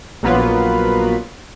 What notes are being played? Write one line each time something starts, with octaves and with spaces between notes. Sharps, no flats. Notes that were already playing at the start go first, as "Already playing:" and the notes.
A#1 F#3 A#3 B3 F4 B4